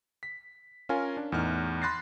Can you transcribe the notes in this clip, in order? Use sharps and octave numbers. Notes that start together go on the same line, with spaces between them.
B6
C#4 F4 A#4 F5 G#5
D4
E2 A2 D#4 F6 F#6
B5 C6 F#6 A6 A#6 C7